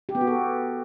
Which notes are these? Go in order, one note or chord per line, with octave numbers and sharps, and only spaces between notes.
G4
B3
F#4
A4